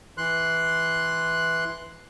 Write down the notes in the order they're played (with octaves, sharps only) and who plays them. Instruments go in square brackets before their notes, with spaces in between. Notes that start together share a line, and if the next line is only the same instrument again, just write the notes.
[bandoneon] E3 C6 F#6